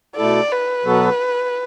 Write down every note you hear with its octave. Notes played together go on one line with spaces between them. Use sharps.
B2 A3 E4 A4 D5
B4
B2 F#3 B3 F#4 A4